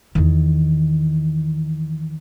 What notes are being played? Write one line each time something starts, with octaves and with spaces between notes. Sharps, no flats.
E2 D#3